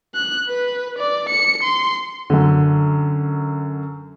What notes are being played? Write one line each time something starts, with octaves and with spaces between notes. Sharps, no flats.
F#6
B4
D5
C#7
C6
F#2 D3